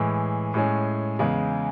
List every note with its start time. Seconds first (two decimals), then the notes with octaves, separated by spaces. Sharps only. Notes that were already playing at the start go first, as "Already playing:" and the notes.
Already playing: A2 E3 G#3
0.54 A2 G#3 C#4
1.19 E2 C#3 G#3